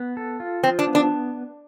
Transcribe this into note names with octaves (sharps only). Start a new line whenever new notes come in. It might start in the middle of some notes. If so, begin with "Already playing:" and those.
Already playing: B3
A4
F4
F3 C4
D4
B3
D4